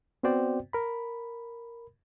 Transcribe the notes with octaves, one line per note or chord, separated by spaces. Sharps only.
B3 C4 F#4 C5 D5 G5
A#4 B5